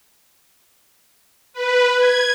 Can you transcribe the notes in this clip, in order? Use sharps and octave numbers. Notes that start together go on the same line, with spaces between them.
B4
G#6